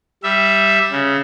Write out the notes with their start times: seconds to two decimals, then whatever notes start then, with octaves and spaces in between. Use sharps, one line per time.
0.23 G3 E5
0.91 C#3